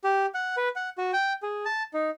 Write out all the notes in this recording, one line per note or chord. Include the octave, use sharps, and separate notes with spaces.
G4
F#5
B4
F#5
F#4
G5
G#4
A5
D#4